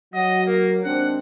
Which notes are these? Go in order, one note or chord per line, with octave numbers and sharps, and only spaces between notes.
F#3 D#5 F#5
A#3 A#4
D#2 G#3 C4 D4 F#5